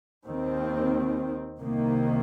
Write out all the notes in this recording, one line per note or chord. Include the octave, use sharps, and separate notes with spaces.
D#2 D#3 C4
C2 C3 D#3 A#3